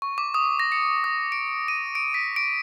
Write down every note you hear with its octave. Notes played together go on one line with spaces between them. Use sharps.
C#6
D6
D#6
A#6
C#7
D#6
D7
D#7
D7
B6
D7